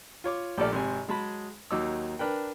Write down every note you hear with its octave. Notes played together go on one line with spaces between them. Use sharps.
F4 C#5 D6
A#1 A3 G4 A4 D5 F6
G#1 C3 G#5
F#3 G#3 G#4 A5 B5
D#2 F#3 D#4 D6 E6
D4 A#4 B4 G5